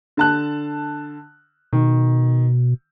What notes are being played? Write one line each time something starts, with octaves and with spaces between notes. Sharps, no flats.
D3 A5 F#6
B2 D#3